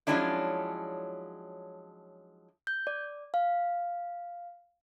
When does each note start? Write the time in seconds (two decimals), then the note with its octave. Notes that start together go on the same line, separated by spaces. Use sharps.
0.07 F3 F#3 G#3 C#4 D4 E4
2.67 G6
2.87 D5
3.34 F5